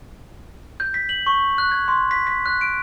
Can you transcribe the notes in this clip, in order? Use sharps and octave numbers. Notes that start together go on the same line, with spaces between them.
G6
B6
F#7
C#6
F#6
G#6
C6
B6
B6
F#6
D7